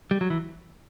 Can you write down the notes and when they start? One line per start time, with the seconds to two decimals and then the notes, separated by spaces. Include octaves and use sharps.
0.11 G3
0.21 F#3
0.30 E3